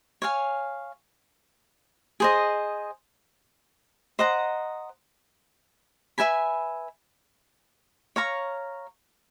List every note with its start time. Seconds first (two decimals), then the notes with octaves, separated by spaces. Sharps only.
0.22 C#5 F5 G#5
2.20 G#4 C5 D#5
4.19 C5 D#5 F#5 A#5
6.18 B4 E5 G#5 B5
8.16 C#5 F5 A#5 C#6